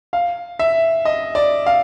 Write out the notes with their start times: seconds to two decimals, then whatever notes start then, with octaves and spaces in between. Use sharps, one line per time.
0.13 F5
0.59 E5
1.05 D#5
1.35 D5
1.66 F5